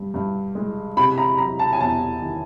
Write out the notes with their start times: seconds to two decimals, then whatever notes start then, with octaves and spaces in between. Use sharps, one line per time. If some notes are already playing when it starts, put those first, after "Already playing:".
Already playing: G2
0.14 G2
0.55 G#3
0.97 C3 B5
1.18 A#5
1.38 F#3 A#5
1.59 A5
1.73 G#5
1.81 E2 A5
2.21 D#3